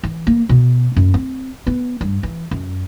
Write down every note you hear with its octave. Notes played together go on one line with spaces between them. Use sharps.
E3
A#3
B2
F#2
C4
B3
G2
E3
F#2